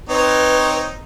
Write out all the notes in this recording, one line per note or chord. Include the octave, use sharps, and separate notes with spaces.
C4 D#4 B4 C#5